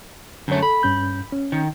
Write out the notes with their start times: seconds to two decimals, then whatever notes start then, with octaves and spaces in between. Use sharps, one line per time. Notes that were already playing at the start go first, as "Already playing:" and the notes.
0.48 F#2 D3 A3 C#5
0.63 A4 B5
0.83 G2 C#4 G6
1.32 C#4
1.52 D#3